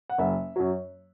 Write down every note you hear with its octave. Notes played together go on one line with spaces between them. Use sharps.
F#5
F#1 E5
F#2 F#3